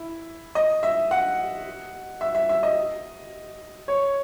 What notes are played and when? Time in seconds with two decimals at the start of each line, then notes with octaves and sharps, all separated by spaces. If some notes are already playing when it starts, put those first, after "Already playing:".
Already playing: E4
0.55 D#5
0.83 E5
1.11 F#5
2.21 E5
2.35 E5
2.49 E5
2.63 D#5
3.88 C#5